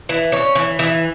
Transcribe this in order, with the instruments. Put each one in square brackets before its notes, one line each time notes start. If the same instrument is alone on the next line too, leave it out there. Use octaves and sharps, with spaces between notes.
[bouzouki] E3
C#4
E3
E3